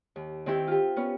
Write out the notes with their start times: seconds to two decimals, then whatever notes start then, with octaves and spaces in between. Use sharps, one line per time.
0.16 D#2
0.46 D#3 C4 E4 G4
0.67 F4 G4
0.96 B3 C#4